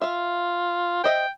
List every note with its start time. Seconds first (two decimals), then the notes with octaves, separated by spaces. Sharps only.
0.02 F4 E5 F5
1.04 C5 D#5 E5 G5